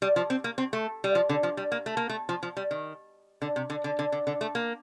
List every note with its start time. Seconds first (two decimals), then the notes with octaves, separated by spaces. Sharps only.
0.02 G3
0.16 F3
0.30 C4
0.44 A#3
0.58 C4
0.73 A3
1.04 G3
1.15 F3
1.29 D3
1.43 F3
1.57 G3
1.72 A#3
1.86 A3
1.97 A#3
2.09 A3
2.29 F3
2.43 F3
2.57 G3
2.71 D#3
3.42 D3
3.56 C3
3.70 D3
3.84 D3
3.99 D3
4.12 D3
4.27 D3
4.41 A3
4.55 A#3